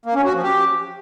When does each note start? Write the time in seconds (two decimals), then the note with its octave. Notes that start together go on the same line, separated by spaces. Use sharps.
0.06 A#3
0.15 C#4
0.24 F#4
0.34 F3
0.43 G4